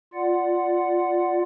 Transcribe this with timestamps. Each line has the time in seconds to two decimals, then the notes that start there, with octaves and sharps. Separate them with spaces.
0.14 F4 D5 F#5